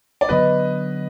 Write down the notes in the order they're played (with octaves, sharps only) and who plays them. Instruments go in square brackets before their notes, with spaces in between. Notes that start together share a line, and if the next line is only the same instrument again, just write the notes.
[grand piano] D5
[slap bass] D3 F#3 B3 D4 [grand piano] B4 D#5